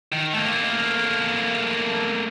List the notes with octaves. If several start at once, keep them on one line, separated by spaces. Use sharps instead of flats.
D#3
A3 A#3